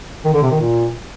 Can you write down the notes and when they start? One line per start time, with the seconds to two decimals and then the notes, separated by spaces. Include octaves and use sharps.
0.24 D#3
0.33 D3
0.42 C3
0.51 D#3
0.60 A#2